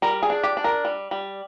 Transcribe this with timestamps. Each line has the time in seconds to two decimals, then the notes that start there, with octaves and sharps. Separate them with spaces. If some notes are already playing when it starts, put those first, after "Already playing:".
0.02 G3 A#4
0.22 G#4
0.30 D4
0.43 G4
0.57 D4
0.64 A#4
0.85 G3
1.11 G3